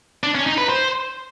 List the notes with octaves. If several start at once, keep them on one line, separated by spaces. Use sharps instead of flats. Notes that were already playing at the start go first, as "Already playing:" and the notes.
D4
C#4
D#4
B4
C5